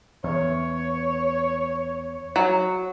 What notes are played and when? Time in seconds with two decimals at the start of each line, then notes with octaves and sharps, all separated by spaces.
0.24 E2 C#5
2.36 F#3